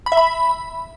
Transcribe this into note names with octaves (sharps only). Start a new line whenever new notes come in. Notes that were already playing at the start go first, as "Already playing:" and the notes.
B5
E5
B5